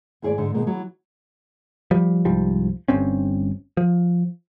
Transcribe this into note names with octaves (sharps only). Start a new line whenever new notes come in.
D#2 G#2 G#4 C#5 D5
G#2 D3
B2 D#3 G#3 A#3
E3 F#3
F3 G3
C2 G#2 F3 G3
G1 G2 C4 C#4
F3